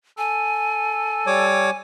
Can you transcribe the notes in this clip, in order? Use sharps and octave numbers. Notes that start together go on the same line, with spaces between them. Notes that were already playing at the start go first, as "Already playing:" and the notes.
A4 G#5
G3 C#5 D6